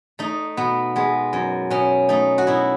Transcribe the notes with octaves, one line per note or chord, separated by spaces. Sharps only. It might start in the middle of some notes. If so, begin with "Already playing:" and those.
A3 D#4
B2 B3
G#3 B3
F#2
B2 C#4
A3 D#4
F#4
B2 E4